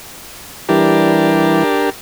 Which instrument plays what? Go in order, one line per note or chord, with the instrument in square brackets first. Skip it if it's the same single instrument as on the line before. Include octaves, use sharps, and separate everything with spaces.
[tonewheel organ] E3 G3 E4 [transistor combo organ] D4 G4 A#4